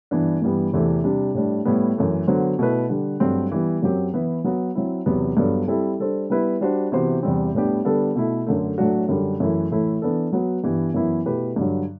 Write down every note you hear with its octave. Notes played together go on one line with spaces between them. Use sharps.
G2 E3 B3 D4
G2 E3 G3 B3
E2 C3 E3 A3 C4
C3 G3 D4
A2 G3 D4
A2 G3 B3
F#2 E3 A3
D3 F#3 B3 F#4 C5
B2 A3 E4 B4
D3 G3 D4
G2 F#3 A3 C4
E3 G3 B3
F#2 F#3 C4 G4
E3 B3 E4 B4
F#3 B3 F#4
F#3 C4 E4
E2 C3 F#3 B3
G2 F#3 B3 D4 A4
G3 C4 E4 A4
G3 D4 A4 C5
G3 B3 E4 B4
G3 D4 F#4 C5
C3 E3 B3 F#4 C5
E2 C3 E3 G3 C4
A2 G3 B3 D4 G4
D3 G3 B3 D4 A4
B2 A3 E4
F#2 D3 A3
A2 F#3 A3 D4 F#4
F#2 D3 G3 D4
F#2 E3 A3 E4
A2 E3 A3 E4
E3 B3 D4 A4
F#3 B3 F#4 B4
G2 E3 G3 B3
F#2 E3 B3 E4
B2 A3 E4 G4 B4
G2 D3 F#3